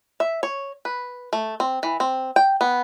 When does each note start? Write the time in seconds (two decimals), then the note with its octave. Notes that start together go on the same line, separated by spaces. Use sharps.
0.20 E5
0.43 C#5
0.85 B4
1.33 A3
1.60 C4
1.83 E3
2.00 C4
2.36 G5
2.61 B3